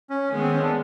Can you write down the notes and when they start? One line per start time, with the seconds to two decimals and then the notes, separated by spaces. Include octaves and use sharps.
0.10 C#4
0.30 D#3 G#3 B3
0.42 C4
0.52 C#4
0.63 D4